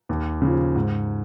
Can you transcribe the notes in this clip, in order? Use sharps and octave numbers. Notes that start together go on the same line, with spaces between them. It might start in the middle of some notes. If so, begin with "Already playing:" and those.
D#2
C#3 F3
G#2